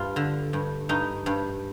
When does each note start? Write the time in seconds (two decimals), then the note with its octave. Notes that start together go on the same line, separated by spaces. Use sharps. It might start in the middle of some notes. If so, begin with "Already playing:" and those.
Already playing: G2 F4
0.16 D3
0.53 G2
0.89 G2 D#4
1.26 G2